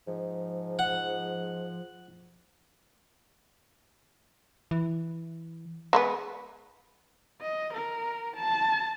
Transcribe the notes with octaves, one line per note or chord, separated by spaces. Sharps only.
G#2 F3
F#5
E3
G#3 A#3 B3
D#5
A#4
A5